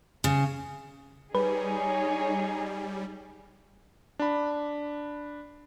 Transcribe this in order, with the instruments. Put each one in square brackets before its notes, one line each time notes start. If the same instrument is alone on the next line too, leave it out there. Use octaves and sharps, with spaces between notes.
[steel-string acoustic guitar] C#3
[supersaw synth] G3 [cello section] D#4 [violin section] G#4 C#5 [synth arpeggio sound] B4
[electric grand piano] D4 B5